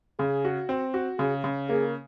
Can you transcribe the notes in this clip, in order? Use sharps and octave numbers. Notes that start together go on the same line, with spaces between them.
C#3 G#4
F#4
C4
F#4
C#3 G#4
C#3
A#3 G#4